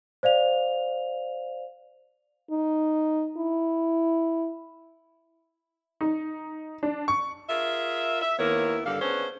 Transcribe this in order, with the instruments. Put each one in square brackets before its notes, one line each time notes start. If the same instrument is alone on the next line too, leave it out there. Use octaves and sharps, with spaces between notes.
[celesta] C5 D5 F5 F7
[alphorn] D#4
E4
[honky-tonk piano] D#4
D4
C#6
[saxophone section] F4 G#4 A#4 E5
E5
D#2 D#3 A#3 B3 E4 C#5
G2 D3 G3 A4 F5
B3 C#4 D4 G#4 B4 C5